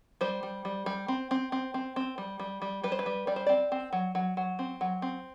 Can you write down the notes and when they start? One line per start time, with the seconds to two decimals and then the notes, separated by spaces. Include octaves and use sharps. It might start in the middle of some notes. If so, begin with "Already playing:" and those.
0.21 G3 C5
0.43 G3
0.65 G3
0.86 G3
1.08 C4
1.31 C4
1.52 C4
1.74 C4
1.96 C4
2.18 G3
2.40 G3
2.62 G3
2.83 G3 B4
2.92 C5
2.99 B4
3.06 G3
3.27 G3 D5
3.36 C5
3.46 C4 D5
3.72 C4
3.93 F#3
4.15 F#3
4.37 F#3
4.59 C4
4.81 F#3
5.02 C4